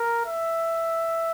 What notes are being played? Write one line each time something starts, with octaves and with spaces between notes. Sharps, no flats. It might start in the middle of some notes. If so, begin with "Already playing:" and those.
Already playing: A#4
E5